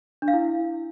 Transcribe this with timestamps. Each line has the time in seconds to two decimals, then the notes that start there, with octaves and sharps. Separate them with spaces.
0.22 D4
0.28 F5
0.33 E4